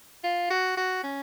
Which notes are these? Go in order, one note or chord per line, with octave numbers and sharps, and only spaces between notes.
F4
F#4
F#4
C#4